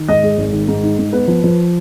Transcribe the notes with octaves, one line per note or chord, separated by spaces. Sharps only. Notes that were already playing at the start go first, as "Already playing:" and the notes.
Already playing: D#3
G#2 D#5
G#3
G#1
D#3
G#2
D#4
G#2
B3 B4
F3
F3